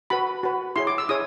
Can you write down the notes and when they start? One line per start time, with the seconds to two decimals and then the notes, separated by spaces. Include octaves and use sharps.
0.10 F#4 B4 B5
0.43 F#4 B4
0.76 E4 G#4 C#5 C6
0.87 D6
0.98 E6
1.09 E4 G#4 C#5 D#6